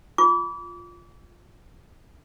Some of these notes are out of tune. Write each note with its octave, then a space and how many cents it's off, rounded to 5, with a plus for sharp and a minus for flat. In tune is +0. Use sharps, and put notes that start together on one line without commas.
F4 +0 D6 -35